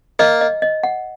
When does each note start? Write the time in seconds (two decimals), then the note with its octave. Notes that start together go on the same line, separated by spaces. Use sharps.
0.19 A#3 D#5
0.41 D#5
0.62 D#5
0.83 F#5